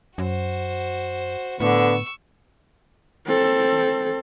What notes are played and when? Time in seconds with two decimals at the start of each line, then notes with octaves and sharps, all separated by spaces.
0.18 F#2 F#4 C5
1.60 A2 D3 B3 C#6 E6
3.27 C4 A4